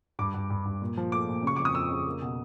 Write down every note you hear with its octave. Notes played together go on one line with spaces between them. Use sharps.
G2 D6
G2
G2
G2
A#2
F3
A3 D6
A#2
C#3 C#6
F2 D6
D#6
F2 E6
C#3
A#3
B2